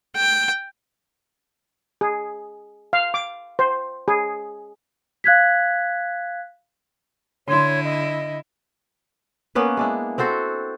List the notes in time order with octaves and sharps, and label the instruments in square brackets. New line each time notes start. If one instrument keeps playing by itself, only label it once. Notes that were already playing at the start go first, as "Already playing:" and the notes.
[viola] G5
[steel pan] G#4
F5
D6
C5
G#4
[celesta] F5 F#6 G#6 B6
[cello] D3 E4 [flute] C#5 [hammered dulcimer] C6
[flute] D#5
[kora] A#3 B3 C#4 B4
G#3 D4 E4
C4 F#4 A4 C5